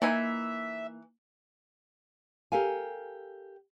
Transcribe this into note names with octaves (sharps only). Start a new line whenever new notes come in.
E3 A#3 D#4 E5 G#5
G4 A4 A#4 F5 G#5